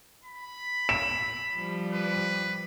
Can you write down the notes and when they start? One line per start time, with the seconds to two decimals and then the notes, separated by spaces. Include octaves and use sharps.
0.24 B5
0.89 E7
1.55 F3 G3
1.93 B4